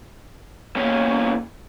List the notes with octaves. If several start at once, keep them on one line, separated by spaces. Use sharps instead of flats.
E2 A#3 C#4